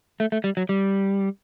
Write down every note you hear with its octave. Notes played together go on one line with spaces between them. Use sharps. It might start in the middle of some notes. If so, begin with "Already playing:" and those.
A3
A3
G3
F#3
G3